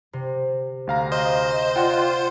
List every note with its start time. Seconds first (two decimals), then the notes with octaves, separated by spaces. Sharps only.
0.13 C3
0.87 D2 F5 A#5
1.12 C5 D#5
1.76 F4 D5 F#5 G5